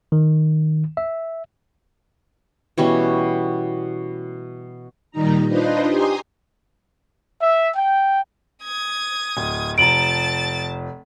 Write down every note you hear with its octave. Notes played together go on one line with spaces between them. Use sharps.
D#3
E5
B2 E3 G3 C#4
A#2 D#3 G3 D#4 A#5
D4 D#4 F4 B4 C5 D#5
G4 G#5 A#5 C6 D#6
E5
G5
D#6 G#6
D1
F1 F3 A5 A#5 A6 D7 F#7